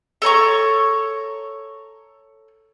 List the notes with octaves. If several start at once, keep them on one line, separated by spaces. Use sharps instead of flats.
A4 C#5 A#5 C#6